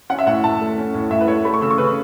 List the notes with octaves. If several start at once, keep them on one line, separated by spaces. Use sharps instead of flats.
C#4 F#5
E5
A2 F#5
A2 A5
A3
C#4
A2
A2 E5
B4
A3 C#5
A3 B5
C#6
C#3 E6
C#6
C#3 B4